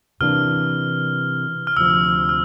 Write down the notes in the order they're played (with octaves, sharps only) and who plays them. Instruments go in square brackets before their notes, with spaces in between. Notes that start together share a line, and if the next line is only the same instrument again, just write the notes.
[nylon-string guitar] C3 E3 A#3 D4 [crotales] F6
[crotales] F6
[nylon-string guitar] D2 C3 F3 [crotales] E6
[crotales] F6